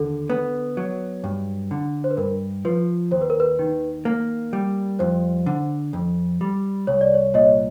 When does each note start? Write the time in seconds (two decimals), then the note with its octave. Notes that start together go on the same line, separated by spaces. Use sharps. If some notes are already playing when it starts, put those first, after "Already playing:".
Already playing: D#2 D3 A4
0.30 B3
0.77 F#3
1.24 G2
1.71 D3
2.04 C5
2.11 B4
2.17 G2 A#4
2.65 F3 B4
3.11 D#2 C5
3.21 B4
3.30 A#4
3.40 B4
3.59 D#3
4.05 A#3
4.53 G3
4.99 F2 C5
5.46 D3
5.93 F2
6.41 G3
6.87 C2 C#5
7.01 D5
7.14 C#5
7.34 A#2 C#5 D#5